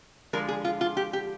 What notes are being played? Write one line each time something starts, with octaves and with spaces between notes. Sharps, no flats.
D3 F3 G#3 A#4
G#4
F4
F4
G4
G4